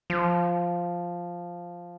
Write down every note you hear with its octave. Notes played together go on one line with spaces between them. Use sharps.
F3